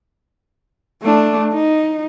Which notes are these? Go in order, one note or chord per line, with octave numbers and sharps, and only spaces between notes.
A3 D4
D#4